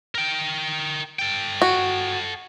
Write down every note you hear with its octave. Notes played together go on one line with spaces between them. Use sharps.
A#4 G5
A4 G5
F#4